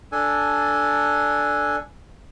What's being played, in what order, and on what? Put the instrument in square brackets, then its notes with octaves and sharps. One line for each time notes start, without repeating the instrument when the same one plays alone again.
[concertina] D4 A4 G#5